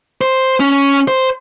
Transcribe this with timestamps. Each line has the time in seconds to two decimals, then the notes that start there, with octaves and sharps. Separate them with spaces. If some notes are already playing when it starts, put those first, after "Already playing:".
0.21 C5
0.60 C#4
1.08 C5